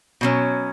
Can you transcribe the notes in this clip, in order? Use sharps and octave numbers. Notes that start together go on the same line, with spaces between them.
B2 F#3 C#4